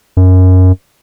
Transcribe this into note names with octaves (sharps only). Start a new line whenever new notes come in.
F#2